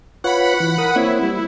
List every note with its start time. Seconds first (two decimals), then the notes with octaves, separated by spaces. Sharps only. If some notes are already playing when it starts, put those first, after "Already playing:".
0.24 F4 B4 C#5 F#5 B5
0.60 E3
0.78 A#4 D#6
0.96 A#3 C4 E4 C#5
1.23 G3